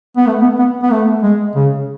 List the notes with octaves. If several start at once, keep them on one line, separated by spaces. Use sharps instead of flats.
B3
A3
B3
B3
B3
A3
G#3
C#3